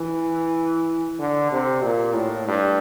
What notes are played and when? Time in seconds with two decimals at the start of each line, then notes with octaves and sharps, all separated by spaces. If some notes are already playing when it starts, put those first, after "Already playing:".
Already playing: E3
1.19 D3
1.52 C3
1.84 A#2
2.15 A2
2.48 G2